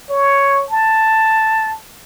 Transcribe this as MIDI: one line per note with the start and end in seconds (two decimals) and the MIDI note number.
0.10 0.65 73
0.70 1.75 81